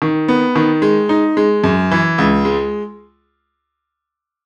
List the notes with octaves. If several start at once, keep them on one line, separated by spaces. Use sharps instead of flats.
D#3
B3
D#3
G#3
D#4
G#3
F#2
E3
C#2
G#3